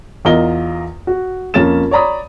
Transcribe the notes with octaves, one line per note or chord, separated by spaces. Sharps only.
E2 F4 A#4 D#5 G7
F#4
F2 A#3 C#4 A6 E7
C#5 D5 A#5 B5 D#6